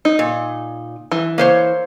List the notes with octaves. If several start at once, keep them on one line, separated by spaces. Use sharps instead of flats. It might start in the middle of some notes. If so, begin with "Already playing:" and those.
D#4
A#2
E3
A#3 C5 C#5